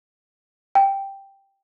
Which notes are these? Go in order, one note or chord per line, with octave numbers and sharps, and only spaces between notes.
G5